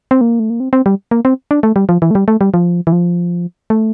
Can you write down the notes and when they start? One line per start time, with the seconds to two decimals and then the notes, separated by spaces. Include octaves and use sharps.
0.11 C4
0.21 A#3
0.39 A3
0.50 A#3
0.60 C4
0.73 C4
0.86 G3
1.11 A#3
1.25 C4
1.51 D4
1.63 A3
1.76 G3
1.89 F3
2.02 E3
2.11 A3
2.15 G3
2.28 A3
2.41 G3
2.54 F3
2.87 E3
2.92 F3
3.70 A3